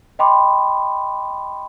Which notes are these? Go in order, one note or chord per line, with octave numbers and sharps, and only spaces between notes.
D#5 G5 B5 C6 D6